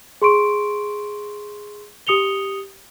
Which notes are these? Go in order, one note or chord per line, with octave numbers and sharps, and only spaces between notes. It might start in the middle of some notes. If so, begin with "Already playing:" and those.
G#4 C6 C#6 D7
G4 D#6 C#7 F7 G7